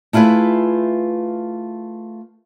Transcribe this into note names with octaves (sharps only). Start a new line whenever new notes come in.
A3 E4 F4 G#4 B4